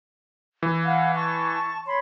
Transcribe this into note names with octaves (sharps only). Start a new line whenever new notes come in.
E3
F5 F#5
A5 C#6
C#5 B5 C6